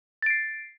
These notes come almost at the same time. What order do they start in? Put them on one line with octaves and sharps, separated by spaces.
A6 D7 C7